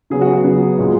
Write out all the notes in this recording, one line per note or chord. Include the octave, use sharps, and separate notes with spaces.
C#3 F#3 B3 G#4
F#4
F#4
C#3 F#3 B3
A#2 G#3 B3